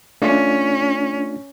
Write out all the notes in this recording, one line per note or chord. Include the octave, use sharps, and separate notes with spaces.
A3 C#4 D4 F4